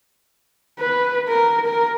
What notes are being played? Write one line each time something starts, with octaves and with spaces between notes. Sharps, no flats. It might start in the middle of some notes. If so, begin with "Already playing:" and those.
B4
A#4
A#4